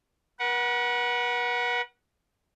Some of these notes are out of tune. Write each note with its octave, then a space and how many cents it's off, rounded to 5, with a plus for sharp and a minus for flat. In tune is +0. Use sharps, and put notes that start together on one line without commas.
B4 -45 F#5 +0